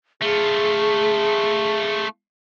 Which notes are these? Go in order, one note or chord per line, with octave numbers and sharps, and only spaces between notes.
A3 F4 G#4